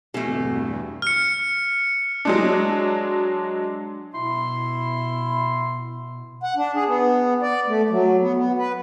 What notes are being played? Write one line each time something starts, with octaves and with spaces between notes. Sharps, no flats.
D1 E2 G2 B2 A3 G4 G#5
F6 C#7
F#3 G#3 D4
B2 E4 C6
F#5
D4
G#4
B3
D5
A3
F#3
B3
B3
B4